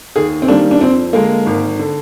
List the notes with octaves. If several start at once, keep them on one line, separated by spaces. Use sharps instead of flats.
D#2 G#4
C4
D#3 G3 A#3 D4
D4
F2 C4
D3 G#3 A#3
G#1
D3